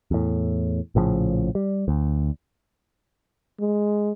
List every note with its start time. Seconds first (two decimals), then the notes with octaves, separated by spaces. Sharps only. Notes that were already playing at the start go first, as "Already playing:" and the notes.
0.11 E2 A2
0.95 A#1 A2 C#3 F3
1.55 G3
1.88 D2
3.60 G#3